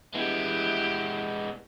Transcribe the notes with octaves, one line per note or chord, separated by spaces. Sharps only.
G#3 B3 E4 G4